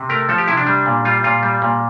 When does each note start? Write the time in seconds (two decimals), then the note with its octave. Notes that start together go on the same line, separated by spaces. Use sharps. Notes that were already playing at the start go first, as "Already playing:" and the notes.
Already playing: C3
0.09 A3 A#4
0.29 F3 A4
0.38 G4
0.48 C3 E4
0.57 D4
0.67 G3
0.86 A#2
1.05 G3 F4
1.24 A#2 F4
1.43 G3
1.62 A#2